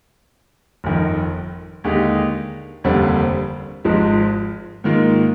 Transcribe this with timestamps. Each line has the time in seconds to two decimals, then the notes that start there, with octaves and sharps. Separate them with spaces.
0.84 G1 F2 D#3
1.84 D#2 D3 G#3 D#4 G4
2.84 F1 D#2 D3 G3 C4
3.84 G#1 G#2 F3 G#3
4.84 G#2 D#3 A#3 F4 A#4